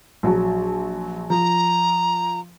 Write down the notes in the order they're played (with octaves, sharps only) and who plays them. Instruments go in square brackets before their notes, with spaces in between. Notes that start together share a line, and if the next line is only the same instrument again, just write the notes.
[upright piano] A#1 F#3 A5
[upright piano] F3 [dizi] A#5